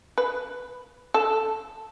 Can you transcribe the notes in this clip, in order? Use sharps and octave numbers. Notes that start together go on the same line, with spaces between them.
B4
A4